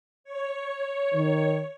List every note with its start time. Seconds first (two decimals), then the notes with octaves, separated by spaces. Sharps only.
0.24 C#5
1.14 D#3